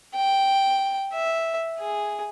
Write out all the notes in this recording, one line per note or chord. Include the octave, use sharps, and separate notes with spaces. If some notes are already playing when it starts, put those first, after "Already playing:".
G5
E5
G#4